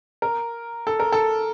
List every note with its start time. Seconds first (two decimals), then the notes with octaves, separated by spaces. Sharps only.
0.22 A#4
0.87 A4
1.00 A#4
1.12 A4